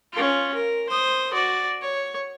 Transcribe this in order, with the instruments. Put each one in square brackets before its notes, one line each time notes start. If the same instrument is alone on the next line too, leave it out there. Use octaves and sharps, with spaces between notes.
[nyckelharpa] C#4 F4
A#4
C5 D#6
F#4 D5
C#5